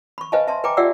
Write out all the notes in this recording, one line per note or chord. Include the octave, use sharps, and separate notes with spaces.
B5 C#6
B4 C5 D#5 F5 G#5 A5
E5 A5 C6
B4 G5 G#5 A#5 D6
F4 G4 D5 E5 F#5 E6